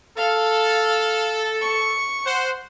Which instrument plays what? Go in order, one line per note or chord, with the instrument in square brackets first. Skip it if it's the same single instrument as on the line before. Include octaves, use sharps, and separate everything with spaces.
[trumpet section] A4 [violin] F5
[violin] C#6
[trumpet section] C5 F#5